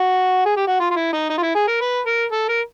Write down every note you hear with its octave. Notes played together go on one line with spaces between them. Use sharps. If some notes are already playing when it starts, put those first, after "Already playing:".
Already playing: F#4
G#4
G4
F#4
F4
F4
E4
D#4
D#4
F4
E4
G#4
A#4
B4
A#4
A4
A#4